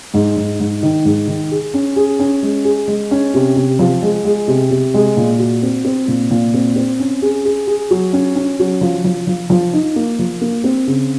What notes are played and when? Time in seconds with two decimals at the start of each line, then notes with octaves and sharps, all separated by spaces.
0.14 G#2
0.37 G#2
0.60 G#2
0.83 D#3
1.05 G#2
1.28 D#3
1.51 G#4
1.74 C#4
1.96 G#4
2.19 C#4
2.43 G#3
2.65 G#4
2.88 G#3
3.11 C#4
3.34 C3
3.56 C3
3.79 F3
4.02 G#3
4.25 G#3
4.48 C3
4.70 C3
4.94 G#3
5.17 A#2
5.39 F#4
5.63 C4
5.85 C4
6.08 A#2
6.31 A#2
6.54 C4
6.76 C4
7.00 C#4
7.22 G#4
7.45 G#4
7.67 G#4
7.91 F#3
8.13 C#4
8.35 C#4
8.59 F#3
8.81 F3
9.04 F3
9.27 F3
9.50 F3
9.73 D#4
9.96 A#3
10.19 F3
10.41 A#3
10.64 C4
10.87 C#3